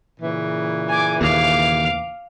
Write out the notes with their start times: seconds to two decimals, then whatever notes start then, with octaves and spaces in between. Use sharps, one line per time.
0.21 A#2 C#3 E3
0.89 G#5 D6
1.21 D#2 F5 D6